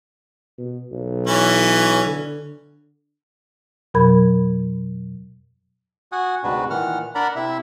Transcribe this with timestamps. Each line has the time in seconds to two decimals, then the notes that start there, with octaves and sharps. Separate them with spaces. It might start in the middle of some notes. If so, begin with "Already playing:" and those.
0.58 B2
0.92 B1
1.27 E3 C#4
2.06 D3
3.94 F2 B2 F#3 A#4 B5 G#6
6.12 F#4 F#5 G#5 D#6
6.44 D2 G#2 C3 D4 F#4 B4
6.70 A#2 D#3 E3 F#5 F6
7.15 D4 A#4 D5 F#5 A#5 B5
7.36 C3 E4 E5